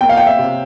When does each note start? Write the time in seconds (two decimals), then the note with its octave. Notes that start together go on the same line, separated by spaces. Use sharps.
0.01 A#3 G5
0.09 F5
0.17 G5
0.27 E5
0.39 C3